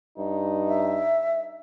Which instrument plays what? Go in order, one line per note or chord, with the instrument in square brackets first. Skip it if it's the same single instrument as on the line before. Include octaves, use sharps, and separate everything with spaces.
[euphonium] G2 [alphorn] D#4
[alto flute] E5